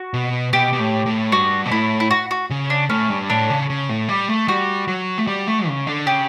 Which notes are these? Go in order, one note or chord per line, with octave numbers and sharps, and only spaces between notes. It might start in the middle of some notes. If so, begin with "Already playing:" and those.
Already playing: F#4
B2
B2 G4
B2
A2
A2
G2 F#4
B2
A2 E4
E4
F#4
F#4
C#3
D4
A2 C#4
G2
A2 D4
C#3
C#3
A2
G3
A3
G3 F#4
F#3
A3
G3
A3
C#3
D3
C#3 G4